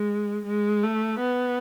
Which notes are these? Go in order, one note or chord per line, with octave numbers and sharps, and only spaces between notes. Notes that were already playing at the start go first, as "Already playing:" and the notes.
Already playing: G#3
G#3
A3
B3